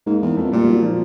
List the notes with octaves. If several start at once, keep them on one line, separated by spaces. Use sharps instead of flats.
G#2 A#3
E2
F2 A3
A#2 G3
F#3
F3